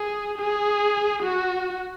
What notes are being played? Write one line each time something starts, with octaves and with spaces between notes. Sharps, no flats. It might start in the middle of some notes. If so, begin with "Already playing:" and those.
Already playing: G#4
G#4
F#4